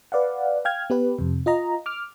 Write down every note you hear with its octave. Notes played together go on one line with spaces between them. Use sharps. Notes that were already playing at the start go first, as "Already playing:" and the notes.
B4 D5 F5 F#5
F5 G5 F6 G#6
B3 G4 B4
F2 C3
F4 D#5 A#5
D6 F6